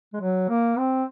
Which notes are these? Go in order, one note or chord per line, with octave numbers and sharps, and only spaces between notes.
G#3
F#3
A#3
C4